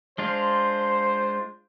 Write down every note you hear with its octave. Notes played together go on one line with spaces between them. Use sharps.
G#3 D4 F4 C5